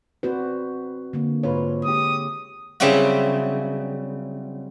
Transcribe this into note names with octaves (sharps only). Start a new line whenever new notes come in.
C4 F#4 B4 C5 D5
D3 A#3
G#2 F4 B4 C#5
G#3 G4 D#6
C#3 F#3 G3 C4 E4 F#4